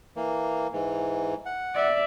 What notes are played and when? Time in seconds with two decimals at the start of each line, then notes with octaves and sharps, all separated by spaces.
0.16 E3 A#3
0.73 G#2 E3
1.46 F#5
1.75 D5 E5